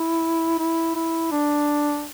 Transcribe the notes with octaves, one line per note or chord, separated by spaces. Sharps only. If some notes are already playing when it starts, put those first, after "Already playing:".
Already playing: E4
E4
E4
D4